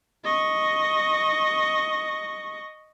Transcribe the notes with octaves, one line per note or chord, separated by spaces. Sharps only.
D#5 C#6